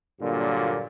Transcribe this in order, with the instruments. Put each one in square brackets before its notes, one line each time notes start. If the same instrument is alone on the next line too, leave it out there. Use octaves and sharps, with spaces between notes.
[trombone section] G2 A#2 D3 F#3 A#3 F4